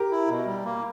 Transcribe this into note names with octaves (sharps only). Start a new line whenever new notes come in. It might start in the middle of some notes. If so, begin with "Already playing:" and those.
Already playing: G4 A#4
E4
B2
G3
A#3